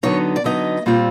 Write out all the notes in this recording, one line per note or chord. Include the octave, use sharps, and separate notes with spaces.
D3 F#3 B3 D#4 C#5
D5
D3 F#3 B3 D#4 D#5
A#2 G3 C4 F4